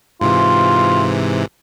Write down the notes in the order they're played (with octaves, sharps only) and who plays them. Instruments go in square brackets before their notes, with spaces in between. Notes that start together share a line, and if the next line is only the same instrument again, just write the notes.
[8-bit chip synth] G#2 C3 E3 [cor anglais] F4